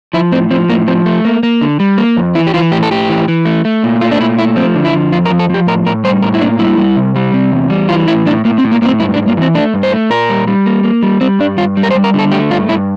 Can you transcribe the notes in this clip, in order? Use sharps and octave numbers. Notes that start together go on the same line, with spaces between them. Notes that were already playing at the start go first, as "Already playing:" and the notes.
F3 E4
A2 C4
F3 C4
A2 A#3
F3 C4
A3
A#3
A#3
D3
G3
A#3
F2
E3 E4
G4
E3 F4
A2 G4
A4
A2 G4
E3
E3
A3
A3
A#2
A3 F4
D4
A#2 E4
A3 E4
F3 C4
D3
E4
F3
F2 F4
A#4
F3
A4
F3 G4
A2 A#4
A2 A#4
G3 C5
A2 A#4
E4
A#3 D4
G3 E4
G3
C3
G3
C3
E2
G3
E3 F4
A2 E4
A2 D4
A2 A#3
C4
A2
A#3
A2 A#3 C4
G2 E4
D4
G2
A#3
E3 C4
A3 D4
G2
C5
A3
A#2 A#4
G3
G3
A#3
A#3
G3
G3 C4
G2 D4
G2 F4
G3
A#4
C5
G3
A#4
D3 A4
A3 G4
G2 F4
G2 E4